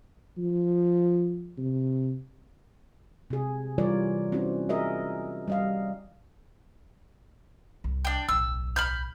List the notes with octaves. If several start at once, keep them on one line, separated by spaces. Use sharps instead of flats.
F3
C3
C3 G#4
E3 G3 F4 A#4 C#5 D5
C4 C#4 E4 F#4
F#4 G#4 A#4 D#5 E5
G3 D#5 F5
C2
D4 G5
D1 B1 E6
B5 F6 G6